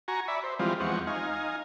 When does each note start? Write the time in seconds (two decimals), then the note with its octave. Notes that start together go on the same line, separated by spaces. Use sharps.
0.08 F#4 G#5 A#5 C#6
0.28 D5 E5 B5
0.44 C5
0.59 E3 F3 G3 G#3 C4 F4
0.80 E2 F3 G#3 C4 F#5 C#6
1.07 D#4 F5 G#5